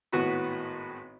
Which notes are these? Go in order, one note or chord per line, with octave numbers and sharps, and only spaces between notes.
G#1 A2 B3 F#4 B4 B5